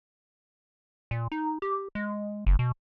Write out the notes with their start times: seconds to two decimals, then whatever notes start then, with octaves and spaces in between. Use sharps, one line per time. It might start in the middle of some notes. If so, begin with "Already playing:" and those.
1.11 A#2
1.32 D#4
1.62 G4
1.95 G#3
2.47 F#1
2.59 B2